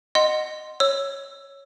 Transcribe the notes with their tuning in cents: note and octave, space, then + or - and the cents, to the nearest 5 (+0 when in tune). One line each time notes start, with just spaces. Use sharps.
D#5 -15 F#5 +0 C6 +0
C#5 +0 E6 +15